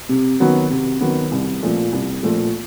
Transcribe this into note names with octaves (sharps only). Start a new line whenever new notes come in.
C3
D#3 F#3 B3
C3
D#3 F#3 B3
C2
A#2 F3 A3
C2
A#2 F3 A3